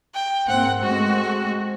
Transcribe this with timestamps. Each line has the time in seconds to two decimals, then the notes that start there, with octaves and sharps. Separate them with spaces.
0.14 G5
0.48 G#2 A#3 C4 F#5
0.82 G#3 A3 C4 F#4